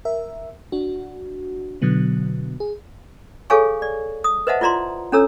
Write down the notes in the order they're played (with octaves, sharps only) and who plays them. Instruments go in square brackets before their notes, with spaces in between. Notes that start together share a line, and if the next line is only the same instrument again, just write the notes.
[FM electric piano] A#4 E5
D4 F#4
B2 D3 F#3 B3
G#4
[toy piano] G#4 A4 C#5 F5 G#5 C#6
D5
D#6
B4 C5 D#5 E5 F#5 A5
E4 F4 D5 A#5 C6
C#4 D4 A4 C#5 A#5 E6